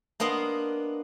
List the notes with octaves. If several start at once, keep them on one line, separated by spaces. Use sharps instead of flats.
A#3 B3 D4 D#5 C6